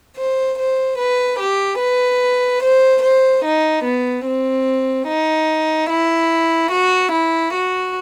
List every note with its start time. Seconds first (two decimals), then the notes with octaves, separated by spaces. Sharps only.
0.17 C5
0.59 C5
0.99 B4
1.40 G4
1.81 B4
2.63 C5
3.03 C5
3.45 D#4
3.85 B3
4.27 C4
5.08 D#4
5.90 E4
6.72 F#4
7.12 E4
7.53 F#4